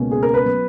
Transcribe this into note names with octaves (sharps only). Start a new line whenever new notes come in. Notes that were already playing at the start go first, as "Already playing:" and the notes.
Already playing: C#2 B2 A#3 C#4
G#4
A#4
B4
F#3 B3